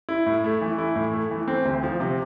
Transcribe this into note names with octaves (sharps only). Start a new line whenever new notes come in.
E4
A2
A3
E3
E4
A2
A3
E3
C4
D2
F3
C3